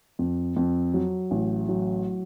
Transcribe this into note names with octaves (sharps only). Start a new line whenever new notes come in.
F2
F2
F#3
A1
F#3